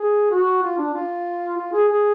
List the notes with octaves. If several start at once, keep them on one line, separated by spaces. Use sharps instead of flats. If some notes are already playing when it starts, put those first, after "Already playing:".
Already playing: G#4
F#4
F4
D4
F4
F4
G#4
G#4